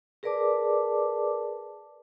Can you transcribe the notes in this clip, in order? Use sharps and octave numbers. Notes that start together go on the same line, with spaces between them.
G#4 A#4 B4 D5 A5 D6